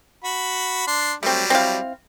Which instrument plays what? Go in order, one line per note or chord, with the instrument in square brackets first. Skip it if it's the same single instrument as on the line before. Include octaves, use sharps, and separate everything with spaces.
[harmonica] F#4 B5
D4 C6
[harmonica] F#3 G3 [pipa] A3 C4
[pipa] C4 E4 F5